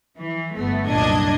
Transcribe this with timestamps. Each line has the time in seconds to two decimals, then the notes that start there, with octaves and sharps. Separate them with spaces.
0.18 E3
0.57 G1 A3 B3
0.87 C2 F#2 A#2 D4 D#5 G#6